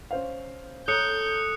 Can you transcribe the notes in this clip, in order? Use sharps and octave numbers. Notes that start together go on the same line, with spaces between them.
C#4 C5 F5
A4 C#5 A#5 D#6 F#6 G6 C#7